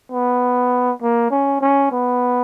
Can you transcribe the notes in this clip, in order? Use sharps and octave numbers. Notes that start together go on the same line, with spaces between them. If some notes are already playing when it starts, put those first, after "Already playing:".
B3
A#3
C#4
C#4
B3